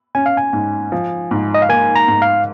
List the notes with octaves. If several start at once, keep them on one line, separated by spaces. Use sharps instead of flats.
C#4 G#5
F5
G#5
G#2
F3
G#2
D#5
F5
A#3 G#5
A#5
G#2
F5